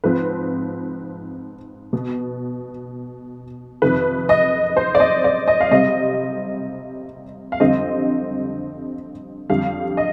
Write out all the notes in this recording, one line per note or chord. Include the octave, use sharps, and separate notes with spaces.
G#2 F3 C4 B4
B2 B3
F2 C3 D#3 B4
D#5
C5
D5
D#5
D5
D#5
F5
C3 G3 C4 D#5
F5
F2 D3 G3 C4 D#5
F2 D3 G3 F5
D#5